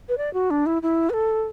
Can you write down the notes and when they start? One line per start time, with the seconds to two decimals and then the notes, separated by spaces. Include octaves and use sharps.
0.09 B4
0.18 D5
0.33 F#4
0.50 D4
0.66 E4
0.82 E4
1.10 B4
1.13 A4